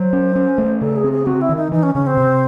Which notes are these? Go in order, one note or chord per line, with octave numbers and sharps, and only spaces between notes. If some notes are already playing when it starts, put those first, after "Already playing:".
Already playing: F#3 C5
C#4
C#4
A3
C#3 A4
G#4
C4
G#4
C4 F#4
E4
D#3
D#4
E3 D#4
C#4
C#3 C#4
C4
C3